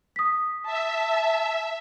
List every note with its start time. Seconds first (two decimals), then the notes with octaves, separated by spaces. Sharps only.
0.16 D#6 B6
0.66 E5 A5